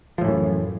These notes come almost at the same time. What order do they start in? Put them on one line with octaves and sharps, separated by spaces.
F3 A2 E3 F#2